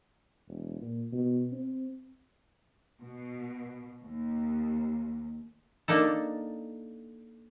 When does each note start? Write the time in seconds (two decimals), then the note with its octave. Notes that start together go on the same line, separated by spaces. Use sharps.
0.48 E1
0.81 A#2
1.12 B2
1.52 C4
3.01 B2
4.03 D#2
5.88 A#3 D4 D#4 A4